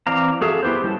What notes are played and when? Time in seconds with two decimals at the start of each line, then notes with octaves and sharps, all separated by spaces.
0.07 E3 C4 D5 F5 A#5
0.41 F#4 G#4 A4 E5 F5
0.63 B3 E4 G4 B4 C5
0.84 G3 G#3 C#4 A5